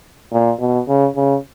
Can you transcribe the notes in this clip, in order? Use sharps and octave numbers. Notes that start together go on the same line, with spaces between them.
A#2
B2
C#3
C#3